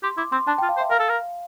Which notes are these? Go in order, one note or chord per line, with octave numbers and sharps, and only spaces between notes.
G4 C6
E4 D6
C4 C6
D4 A5
G5
F4
F5
C5
E5
A#4 F5
A4
A#4